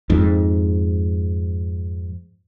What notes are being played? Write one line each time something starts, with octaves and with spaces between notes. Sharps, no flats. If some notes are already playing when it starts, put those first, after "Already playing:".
F2 G#2